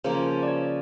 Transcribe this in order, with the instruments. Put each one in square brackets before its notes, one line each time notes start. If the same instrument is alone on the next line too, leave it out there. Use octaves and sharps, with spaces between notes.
[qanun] C#3 F3 A#3 [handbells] C5
[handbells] C5
D5
C#5